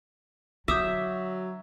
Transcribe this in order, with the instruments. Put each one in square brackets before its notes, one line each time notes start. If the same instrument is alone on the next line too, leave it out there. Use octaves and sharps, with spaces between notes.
[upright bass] D3 [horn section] F#3 [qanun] E5 [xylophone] D6 D#6 G6